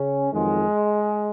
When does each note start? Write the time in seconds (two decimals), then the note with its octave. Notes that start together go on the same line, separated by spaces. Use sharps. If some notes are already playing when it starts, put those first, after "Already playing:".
Already playing: C#3 C#4
0.33 F2 D#3 F#3 G#3